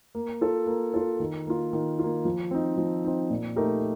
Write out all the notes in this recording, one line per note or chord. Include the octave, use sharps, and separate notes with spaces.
A#3
F4 A4
A#3
F4 A4
D#3
A#3 F4
D#3
A#3 F4
F3
C4 D#4
F3
C4 D#4
A#2
A3 D#4 G4 A#4